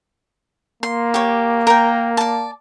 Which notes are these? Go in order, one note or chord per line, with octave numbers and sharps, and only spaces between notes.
A#3 C6
G4 C#5
A#4 G5
D5 A5